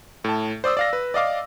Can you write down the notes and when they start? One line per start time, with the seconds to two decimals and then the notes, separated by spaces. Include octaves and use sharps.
0.24 A2 A5
0.64 C5 D5 D#6 E6
0.77 D5 F5 A#6
0.93 B4
1.14 D5 D#5 F5 D6